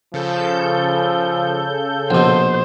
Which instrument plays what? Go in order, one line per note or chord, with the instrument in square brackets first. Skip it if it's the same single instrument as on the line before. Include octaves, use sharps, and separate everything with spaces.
[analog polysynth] C#3 A4 G6 [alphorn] F3
[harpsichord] A#1 B2 [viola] C5